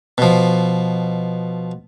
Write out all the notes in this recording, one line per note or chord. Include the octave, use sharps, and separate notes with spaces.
B2 F3